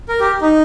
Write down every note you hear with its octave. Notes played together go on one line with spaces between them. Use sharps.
A#4
G4
D#4